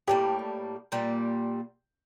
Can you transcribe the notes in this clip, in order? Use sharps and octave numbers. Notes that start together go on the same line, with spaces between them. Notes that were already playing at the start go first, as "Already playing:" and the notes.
A2 G3 A#3 G4
A#2 G3 A#3